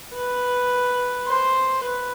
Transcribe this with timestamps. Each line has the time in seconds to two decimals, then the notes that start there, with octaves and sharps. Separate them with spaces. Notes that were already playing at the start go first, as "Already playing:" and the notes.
0.14 B4
1.27 C5
1.84 B4